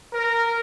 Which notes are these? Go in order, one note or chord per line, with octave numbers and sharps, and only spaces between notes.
A#4